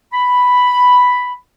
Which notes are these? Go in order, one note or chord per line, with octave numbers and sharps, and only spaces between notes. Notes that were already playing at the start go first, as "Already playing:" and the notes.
B5